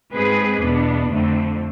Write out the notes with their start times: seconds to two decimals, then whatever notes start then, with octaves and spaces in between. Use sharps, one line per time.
0.12 G#2 G#3 C4 G#4 B4
0.61 E2 B2 B3 D4
1.11 F2 D3 A3 C4